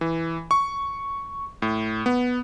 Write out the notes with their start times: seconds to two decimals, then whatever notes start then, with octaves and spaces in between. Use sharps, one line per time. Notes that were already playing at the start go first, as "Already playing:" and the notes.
0.01 E3
0.51 C#6
1.62 A2
2.06 B3